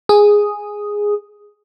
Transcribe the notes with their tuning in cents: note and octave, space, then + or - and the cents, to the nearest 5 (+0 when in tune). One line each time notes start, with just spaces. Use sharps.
G#4 -5 D#6 +0